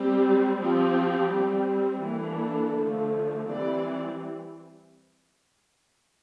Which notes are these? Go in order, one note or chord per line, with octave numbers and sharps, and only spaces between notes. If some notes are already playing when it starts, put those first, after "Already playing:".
Already playing: G3 C4 G4
F3 C4 G4
G3 C4
E3 A#3 D4 A4
D3 F3 A3
E3 G3 C4 D5